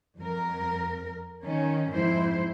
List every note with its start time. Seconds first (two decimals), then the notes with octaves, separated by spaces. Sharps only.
0.17 F2 A#4
1.44 D#3 C#4
1.92 F2 G#2 E4 C5